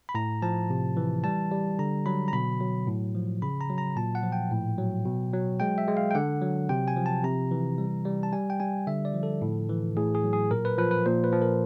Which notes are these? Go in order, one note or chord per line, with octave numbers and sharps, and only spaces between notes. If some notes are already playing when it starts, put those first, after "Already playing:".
B5
A2 A#5
F3 A5
C3
E3
G3 A5
G3
D3 A#5
F#3 B5
A#5
B2 B5
F#3
A2
F3
C#3 B5
A#5
F#3
A#5
A#2 A5
F#5
F3
G5
A2
F#3
B2
F#3
G#3 G5
E5
G#3
F5
G5
D3 F#5
F#3
C3 G5
G#5
F3
A5
C3 A#5
E3
G3
G3
A5
G3 G#5
G5
G3 G#5
D3 E5
D5
F3
A4
A2
E3
A2 G#4
G#4
F#3
G#4
A#2 A#4
B4
F3 B4
B4
A#2 C5
B4
F3
A#4